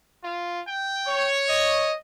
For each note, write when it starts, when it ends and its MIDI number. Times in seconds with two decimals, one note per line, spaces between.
0.24 0.61 65
0.67 1.26 79
1.08 1.93 73
1.49 1.96 75